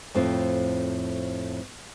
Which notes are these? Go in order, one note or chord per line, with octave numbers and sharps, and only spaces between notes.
F2 A2 C4 F4